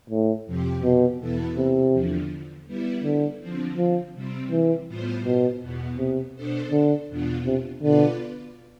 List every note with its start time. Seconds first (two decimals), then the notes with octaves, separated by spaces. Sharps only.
0.10 A2
0.46 F2 C3 F3 C4 G4
0.83 B2
1.20 E2 B2 B3 E4 A4
1.57 C3
1.93 E2 D3 F3
2.67 G3 B3 E4
3.04 D3
3.41 D3 F3 C4
3.77 F3
4.14 C3 G3 C4
4.51 E3
4.88 A2 G3 B3 F4 C5
5.25 B2
5.61 E2 B2 B3
5.98 C3
6.35 B2 B3 D4 A4 C5
6.71 D3
7.09 E2 B2 B3 D4 F4
7.46 C3
7.82 B2 D3 B3 F4 B4 D5